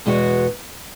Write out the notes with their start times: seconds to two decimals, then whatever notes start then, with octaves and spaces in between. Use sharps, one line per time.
0.06 E2 B2 G#3 B3 F#4